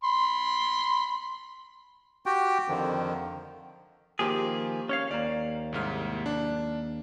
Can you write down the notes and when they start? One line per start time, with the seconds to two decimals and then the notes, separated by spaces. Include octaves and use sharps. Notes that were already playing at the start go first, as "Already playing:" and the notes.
0.04 B5 C6
2.26 F#4 G4 G5
2.68 F2 D3 D#3 F3
4.19 D#3 F3 A#3 G4 G#4
4.89 C#4 C#5 F5
5.11 D#2 A#3 D5
5.72 C2 G#2 F6
6.26 D4